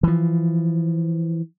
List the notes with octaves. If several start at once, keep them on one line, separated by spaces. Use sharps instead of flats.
E3 F3